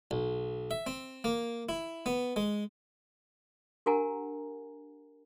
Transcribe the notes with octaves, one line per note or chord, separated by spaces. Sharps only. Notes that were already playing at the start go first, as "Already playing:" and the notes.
B1
E5
C4
A#3
E4
B3
G#3
D4 G4 A#4 F#5 G#5 A#5